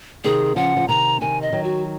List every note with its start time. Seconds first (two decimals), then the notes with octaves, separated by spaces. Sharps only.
0.24 C3 D#3 G#4
0.56 C#3 F3 F#5
0.77 F3
0.88 C3 D#3 A#5
1.21 C3 D#3 G#5
1.42 D#5
1.52 D#3 F#3
1.64 F#4